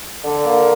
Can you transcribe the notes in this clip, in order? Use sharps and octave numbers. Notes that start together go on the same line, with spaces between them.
D3
A#3